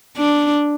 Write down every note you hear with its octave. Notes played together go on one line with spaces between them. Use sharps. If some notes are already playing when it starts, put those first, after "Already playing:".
D4